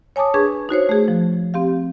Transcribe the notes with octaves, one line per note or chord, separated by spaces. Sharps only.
C#5 G#5 A5 D6 D#6
D4 G#4 B4 C#6 G#6
D#4 F#4 C5 C#5
A3 G#4
F3
C4 G4 F5